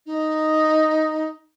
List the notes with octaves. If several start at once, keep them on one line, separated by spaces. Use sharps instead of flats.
D#4